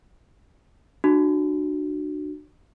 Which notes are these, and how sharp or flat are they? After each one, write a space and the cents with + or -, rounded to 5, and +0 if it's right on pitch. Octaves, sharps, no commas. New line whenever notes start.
D4 +35 F#4 +0